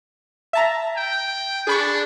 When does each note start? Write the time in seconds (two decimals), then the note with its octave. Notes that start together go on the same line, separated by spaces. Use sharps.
0.53 E5 A5 A#5
0.97 G5
1.67 D4 G#4 B5 C#6